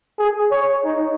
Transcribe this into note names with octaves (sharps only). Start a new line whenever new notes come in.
G#4
C#5
D#4